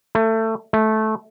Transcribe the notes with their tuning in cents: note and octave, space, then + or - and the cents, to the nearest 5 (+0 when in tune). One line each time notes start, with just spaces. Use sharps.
A3 +20
A3 -15